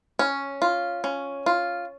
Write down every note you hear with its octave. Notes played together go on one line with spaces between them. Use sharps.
C#4
F4
C#4
F4